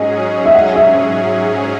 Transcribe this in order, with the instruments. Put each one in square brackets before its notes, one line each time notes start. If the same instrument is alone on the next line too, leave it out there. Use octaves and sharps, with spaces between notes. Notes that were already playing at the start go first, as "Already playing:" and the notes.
Already playing: [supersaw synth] G#2 F#3 C#4 G#4 [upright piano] D#5
[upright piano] E5
F#5
E5